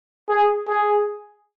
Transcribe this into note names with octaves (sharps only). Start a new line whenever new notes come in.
G#4
G#4